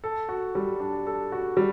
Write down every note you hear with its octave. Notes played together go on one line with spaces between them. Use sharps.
A4
F#4
G3
D4
A4
F#4
G3